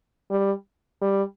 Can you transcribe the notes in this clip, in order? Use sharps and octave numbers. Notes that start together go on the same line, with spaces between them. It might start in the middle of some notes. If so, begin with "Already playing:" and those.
G3
G3